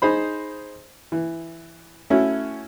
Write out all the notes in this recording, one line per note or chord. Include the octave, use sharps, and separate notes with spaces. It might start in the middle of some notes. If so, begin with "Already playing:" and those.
D#4 G#4 C5 B5
E3
A3 C#4 E4 F#4